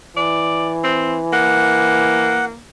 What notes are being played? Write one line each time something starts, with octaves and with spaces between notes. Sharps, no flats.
E3 D5
C4
A#3 F#5